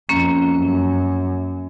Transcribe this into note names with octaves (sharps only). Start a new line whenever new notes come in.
F2 A#3 C#4
F#2